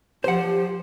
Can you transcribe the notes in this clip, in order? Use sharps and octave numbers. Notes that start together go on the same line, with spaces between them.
F3 G4 C5 F#5